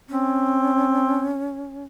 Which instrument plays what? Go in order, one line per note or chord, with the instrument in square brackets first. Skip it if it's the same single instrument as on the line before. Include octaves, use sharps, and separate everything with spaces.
[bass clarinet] C4 [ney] C#4